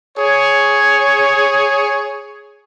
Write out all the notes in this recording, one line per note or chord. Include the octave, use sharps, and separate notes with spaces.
G#4 C#5